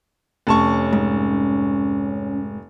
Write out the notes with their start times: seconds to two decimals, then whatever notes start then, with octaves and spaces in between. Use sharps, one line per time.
0.47 F1 C#4 A5 C#6
0.93 G#2